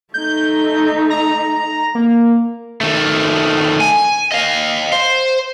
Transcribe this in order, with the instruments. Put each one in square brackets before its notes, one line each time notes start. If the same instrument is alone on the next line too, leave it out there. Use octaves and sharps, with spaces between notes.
[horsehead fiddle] A3 D#4 [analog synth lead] G6
[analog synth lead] A#5
A#3
[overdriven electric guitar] D#3 A3
G#5
D#5 F5
C5